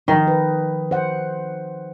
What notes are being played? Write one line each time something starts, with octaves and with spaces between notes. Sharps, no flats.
D#3 F3 D#5
B4
C5 F#5